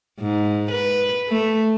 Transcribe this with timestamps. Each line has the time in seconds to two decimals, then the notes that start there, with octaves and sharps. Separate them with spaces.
0.19 G#2
0.71 B4
1.29 A3